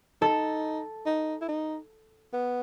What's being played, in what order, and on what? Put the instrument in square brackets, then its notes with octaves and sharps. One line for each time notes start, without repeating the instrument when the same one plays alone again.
[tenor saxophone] D#4 [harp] A4
[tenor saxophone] D#4
E4
D#4
B3